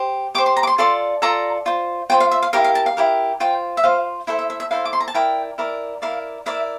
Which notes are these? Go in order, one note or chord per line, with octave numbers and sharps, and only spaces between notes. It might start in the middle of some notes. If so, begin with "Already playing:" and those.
Already playing: G4 C5
G4 C5 D6
C6
A#5
D6
C6
F4 A4 D5 C6
F4 A4 D5 A#5
F4 C5
F4 C5 G5
F5
E5
F5
E4 G4 A#4 F5
F5
A5
F5
E4 G4 A#4
F4 C5 G5
E5
F4 C5 F5
E4 A4 C5 E5
E5
E5
E5
E4 A4 C5 F5
D6
C6
A#5
A5
E4 A#4 D5 G5
E4 A#4 D5
E4 A#4 D5 F5
E4 A#4 D5 E5